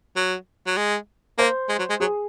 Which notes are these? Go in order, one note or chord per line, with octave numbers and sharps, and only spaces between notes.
F#3
F#3
G#3
A#3 C5
G#3
F#3
G#3
F#3 G#4